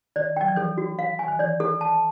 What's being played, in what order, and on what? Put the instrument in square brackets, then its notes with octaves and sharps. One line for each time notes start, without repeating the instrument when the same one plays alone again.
[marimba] D#3 [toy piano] D5
[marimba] F#3 [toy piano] G5
[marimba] F3
[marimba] E3 [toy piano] A4
[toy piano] F#4
F5
G#5
[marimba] D#3
[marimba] E3 [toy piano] D5
[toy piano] A4
A5